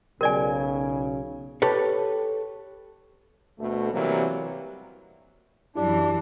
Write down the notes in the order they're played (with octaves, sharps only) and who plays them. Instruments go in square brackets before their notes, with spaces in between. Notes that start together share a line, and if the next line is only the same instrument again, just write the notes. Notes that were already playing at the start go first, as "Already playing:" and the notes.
[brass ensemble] B1 C#3 [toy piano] A#4 D5 G#5
[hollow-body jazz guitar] G4 A4 B4 C#5
[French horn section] D2 B2 A3
C3 E3 F#3 G3 A#3
[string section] F#2 E3 [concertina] D4 [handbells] E4 G4 D5